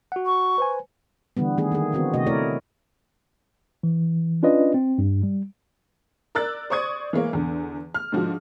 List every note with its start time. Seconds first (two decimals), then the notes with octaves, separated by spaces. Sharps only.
0.12 F#4 F#5
0.26 C#6
0.58 B4 C5 G#5
1.37 D3 E3 G3 B3
1.58 D#3 A3 B3 G#4
1.72 D#3 A#3 G#4
1.92 D3 E3 B3 C4 F#4
2.14 C3 A3 F#4 D#5
2.27 A3 E4 A#4 C#5 D5
3.83 E3
4.43 C#4 D4 F4 B4 D5 D#5
4.74 C4
4.98 G2
5.23 G3
6.35 A#4 D5 E6 F#6 A6
6.70 C5 D5 C#6 D#6 G#6
7.13 E3 G#3 A#3 C#5
7.33 E2 D3
7.94 F6
8.12 G#2 D3 F3 F#4